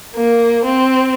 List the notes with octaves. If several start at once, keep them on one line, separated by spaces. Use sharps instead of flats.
A#3
C4